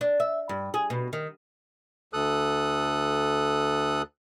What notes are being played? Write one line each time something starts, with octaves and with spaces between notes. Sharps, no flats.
D4
E5
G2
G#4
B2
D#3
D2 A4 D#6 F#6